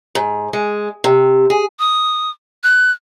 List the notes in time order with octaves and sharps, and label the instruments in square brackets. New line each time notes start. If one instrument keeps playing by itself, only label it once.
[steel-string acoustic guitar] G#2
G#3
C3
G#4
[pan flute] D#6
F#6